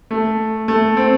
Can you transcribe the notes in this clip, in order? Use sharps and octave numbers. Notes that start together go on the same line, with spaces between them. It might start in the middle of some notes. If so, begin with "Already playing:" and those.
A3
A3
C4